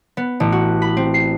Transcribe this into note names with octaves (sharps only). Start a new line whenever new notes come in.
B3
A1
F#4
B5
C4
C7